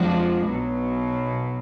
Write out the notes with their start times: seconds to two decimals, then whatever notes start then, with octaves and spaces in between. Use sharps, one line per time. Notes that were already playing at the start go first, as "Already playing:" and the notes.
Already playing: F2 F3 G#3 D4 F#4
0.48 B1 B2 F#3